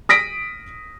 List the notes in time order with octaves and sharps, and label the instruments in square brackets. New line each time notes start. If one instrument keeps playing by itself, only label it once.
[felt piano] D#6 A#6 B6 D7